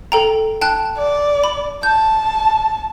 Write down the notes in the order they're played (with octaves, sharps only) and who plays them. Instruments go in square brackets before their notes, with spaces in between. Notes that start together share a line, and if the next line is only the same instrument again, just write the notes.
[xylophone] A4 G5 A#5
G5 A5 F#6
[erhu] D5
[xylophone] B5
[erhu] A5 [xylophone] G6